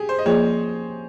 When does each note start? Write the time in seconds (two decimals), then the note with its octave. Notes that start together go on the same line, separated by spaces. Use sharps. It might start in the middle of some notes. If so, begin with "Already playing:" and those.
Already playing: G4 G#4
0.09 C5
0.19 D#5
0.26 F3 A#3 F4 G#4 C#5